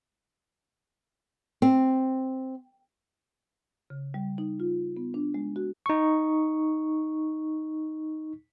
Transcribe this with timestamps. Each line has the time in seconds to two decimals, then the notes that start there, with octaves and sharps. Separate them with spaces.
1.62 C4
3.90 C#3
4.14 G3
4.38 D#4
4.60 F4
4.97 B3
5.14 D4
5.34 G#3
5.56 F#4
5.86 D#4 C#6